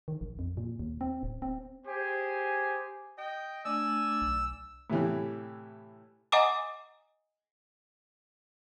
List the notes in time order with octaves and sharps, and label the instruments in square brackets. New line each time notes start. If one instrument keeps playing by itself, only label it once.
[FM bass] D#3
A#1
F2
A#2
D#2
C4
D1
C4
[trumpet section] G4 G#4 C5 G#5
[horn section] D#5 G5
[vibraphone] A3 D4 [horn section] D5 G#5 [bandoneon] E6
[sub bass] B1
[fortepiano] A2 C3 E3 G3
[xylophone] D#5 F#5 G#5 A#5 D6 D#6